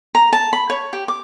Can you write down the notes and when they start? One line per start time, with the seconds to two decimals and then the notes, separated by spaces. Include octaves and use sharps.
0.15 A#5
0.33 A5
0.53 B5
0.70 C#5
0.93 G4
1.08 D6